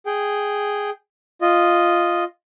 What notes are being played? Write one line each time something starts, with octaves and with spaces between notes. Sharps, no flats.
G#4 G5
F4 D#5